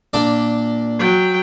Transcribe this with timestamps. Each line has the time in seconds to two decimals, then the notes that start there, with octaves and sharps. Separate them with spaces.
0.13 A#2 D4 D5
0.99 F#3 G5